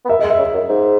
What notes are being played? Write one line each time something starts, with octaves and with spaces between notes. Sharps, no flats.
B3
A#3 E5
G#3 D#5
E5
C#3
F#2
G#2